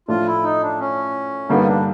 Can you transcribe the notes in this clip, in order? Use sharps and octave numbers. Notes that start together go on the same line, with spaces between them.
A2 F3 A3 D4 F4
E4
D#4
D4
C#4
G2 D3 G3 A#3 B3 D#4
D4